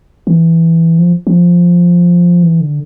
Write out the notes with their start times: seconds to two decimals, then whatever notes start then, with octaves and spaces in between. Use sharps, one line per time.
0.27 E3
0.99 F3
1.27 F3
2.43 E3
2.61 D3